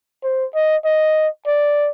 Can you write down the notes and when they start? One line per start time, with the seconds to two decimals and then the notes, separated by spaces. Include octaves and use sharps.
0.24 C5
0.54 D#5
0.85 D#5
1.47 D5